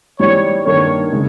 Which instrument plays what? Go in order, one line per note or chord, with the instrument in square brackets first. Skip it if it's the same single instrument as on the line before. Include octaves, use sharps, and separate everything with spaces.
[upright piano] G#2 E3 G3 [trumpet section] C#5
[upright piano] G2 D#3 A#3 [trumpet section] C#5
[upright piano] C#3 G#3 D#4